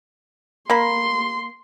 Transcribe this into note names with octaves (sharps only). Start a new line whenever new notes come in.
A#3 B5 C6